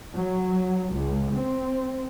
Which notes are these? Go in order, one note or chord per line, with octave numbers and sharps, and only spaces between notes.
F#3
C#2
C4